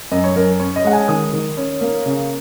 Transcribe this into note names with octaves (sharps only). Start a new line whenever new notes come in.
F#2 D#5
C#5
F#2 A#4
C#4 C#5
D#5
G#3 F#5
G#5
D#3 D#6
D#3
C#4
A#3
C#3